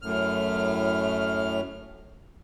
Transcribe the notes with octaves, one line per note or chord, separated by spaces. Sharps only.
F#2 A2 F6